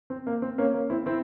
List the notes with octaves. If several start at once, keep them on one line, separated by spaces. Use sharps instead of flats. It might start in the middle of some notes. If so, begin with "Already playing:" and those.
C4
A#3
C4
A#3 C#4
A#3 C#4
C4 E4
C4 E4